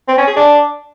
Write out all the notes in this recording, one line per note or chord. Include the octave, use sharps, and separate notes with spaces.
C4
C#4
G#4
D4